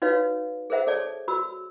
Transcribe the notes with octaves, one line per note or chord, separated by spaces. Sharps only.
D#4 F#4 B4 C#5 F5
G#4 A#4 C5 E5 F#5
G#4 A4 C#5 D5 A5
F#4 B5 E6